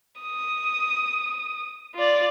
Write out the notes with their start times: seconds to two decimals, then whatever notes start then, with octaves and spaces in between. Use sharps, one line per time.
0.21 D#6
1.95 F4 D5